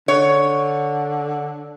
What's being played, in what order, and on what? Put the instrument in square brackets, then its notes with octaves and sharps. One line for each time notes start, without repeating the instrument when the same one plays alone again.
[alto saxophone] D3 [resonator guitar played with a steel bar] C#5